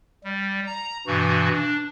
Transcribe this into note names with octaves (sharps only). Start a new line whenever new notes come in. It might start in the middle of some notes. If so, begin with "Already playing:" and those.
G3
A#5
G2 B2 E3 F#4
D4